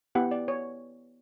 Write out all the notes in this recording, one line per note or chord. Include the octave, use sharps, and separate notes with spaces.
B3 E4 G4 F#5
D5
C#5